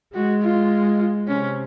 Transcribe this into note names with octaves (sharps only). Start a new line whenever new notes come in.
G#3 F#4
F4
C3 C#4